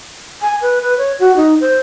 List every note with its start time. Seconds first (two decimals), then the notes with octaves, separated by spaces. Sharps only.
0.42 G#5
0.62 B4
0.82 B4
0.98 C#5
1.20 F#4
1.36 D#4
1.61 C5